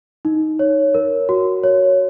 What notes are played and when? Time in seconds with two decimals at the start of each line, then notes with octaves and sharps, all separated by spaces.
0.25 D#4
0.59 C#5
0.94 A#4
1.29 F#4
1.64 C#5